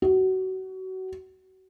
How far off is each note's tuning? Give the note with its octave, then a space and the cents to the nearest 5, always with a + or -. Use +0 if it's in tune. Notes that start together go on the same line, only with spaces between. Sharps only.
F#4 +25